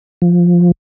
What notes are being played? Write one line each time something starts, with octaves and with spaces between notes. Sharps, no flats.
F3